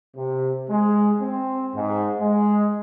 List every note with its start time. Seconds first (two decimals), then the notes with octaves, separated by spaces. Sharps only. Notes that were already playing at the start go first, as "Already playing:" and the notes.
0.15 C3
0.70 G#3
1.19 C4
1.74 G#2
2.19 G#3